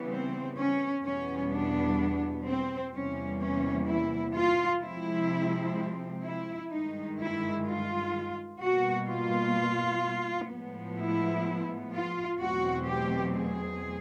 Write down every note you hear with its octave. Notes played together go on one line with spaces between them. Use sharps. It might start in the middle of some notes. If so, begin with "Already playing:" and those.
Already playing: C#3 E3 G3 B3
C4
C#4
E2 B2 G3 B3 C#4
D4
C4
E2 C3 E3 G3 A#3 C#4
C#4
E4
F4
C3 F3 G#3 C4 E4
E4
G2 D#3 G#3 D#4
E4
F4
B2 G3 A#3 F#4
F4
A2 F3 G#3 B3
E4
F4
E2 B2 F#3 A3 C4 F#4
G4
G#4